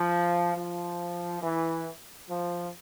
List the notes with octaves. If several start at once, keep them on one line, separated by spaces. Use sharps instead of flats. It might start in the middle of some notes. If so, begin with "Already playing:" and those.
Already playing: F3
F3
E3
F3